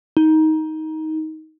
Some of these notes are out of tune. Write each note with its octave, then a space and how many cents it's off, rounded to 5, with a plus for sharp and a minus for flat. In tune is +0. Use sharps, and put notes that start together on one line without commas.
D#4 +15